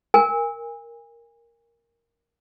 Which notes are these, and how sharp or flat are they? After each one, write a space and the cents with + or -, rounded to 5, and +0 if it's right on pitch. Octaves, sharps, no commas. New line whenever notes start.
A#4 +0 G#5 -30